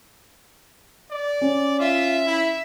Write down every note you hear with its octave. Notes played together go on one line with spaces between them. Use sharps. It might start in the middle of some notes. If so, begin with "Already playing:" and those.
D5
C#4
F4 E5
E4